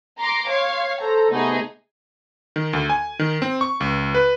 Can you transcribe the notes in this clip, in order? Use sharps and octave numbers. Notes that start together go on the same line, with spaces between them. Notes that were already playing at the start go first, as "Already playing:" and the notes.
A#5 C6 D6
C#5 F5 C6
A4 C5 A#5
C3 A3 B3 D#4 G#4
D#3
D2
G#5
D#3
C4
C#6
C#2
B4